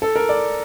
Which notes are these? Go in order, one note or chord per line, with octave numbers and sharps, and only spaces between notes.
A4
A#4
D5